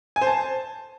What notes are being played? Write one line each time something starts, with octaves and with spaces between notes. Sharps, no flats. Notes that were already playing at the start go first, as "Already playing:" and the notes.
G#5
C5
A5